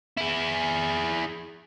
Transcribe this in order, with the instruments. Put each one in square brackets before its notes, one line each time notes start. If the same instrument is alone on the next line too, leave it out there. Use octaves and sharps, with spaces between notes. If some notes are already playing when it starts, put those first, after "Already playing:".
[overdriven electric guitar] E4 G#4